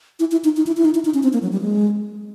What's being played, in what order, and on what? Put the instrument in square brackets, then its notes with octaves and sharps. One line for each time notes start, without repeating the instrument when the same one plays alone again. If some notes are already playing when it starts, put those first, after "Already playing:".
[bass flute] E4
E4
D#4
D#4
E4
E4
D#4
E4
D#4
C#4
C4
A#3
F#3
G3
G#3